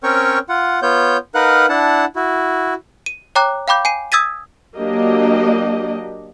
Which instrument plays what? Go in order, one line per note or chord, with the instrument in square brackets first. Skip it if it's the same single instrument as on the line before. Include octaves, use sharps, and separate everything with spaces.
[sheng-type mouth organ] C4 C#4 A#4 C#5 G5 C#6
F4 F#5
B3 F4 C#5 G6
D#4 A#4 B4 F5 F#5 F#6
D4 E4 F#5 A5
E4 F#4
[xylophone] D#7
C#5 G5 A#5 D6 F#6
F5 G5 B5 D6 G6
G#5 C7 D#7
D#6 E6 G#6 A6 B6 D#7
[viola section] F#3 A#3 D4 G4 D#5